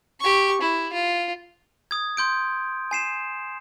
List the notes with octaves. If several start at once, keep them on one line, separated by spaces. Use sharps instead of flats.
G4 C#6
E4
F4
D#6 G#6
C6 G6 D7
G#5 C7 E7